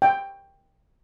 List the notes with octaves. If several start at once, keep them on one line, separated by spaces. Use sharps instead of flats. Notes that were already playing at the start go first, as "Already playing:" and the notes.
G5